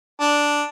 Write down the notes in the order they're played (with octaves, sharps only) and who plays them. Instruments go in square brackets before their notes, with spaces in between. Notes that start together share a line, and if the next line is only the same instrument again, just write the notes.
[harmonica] D4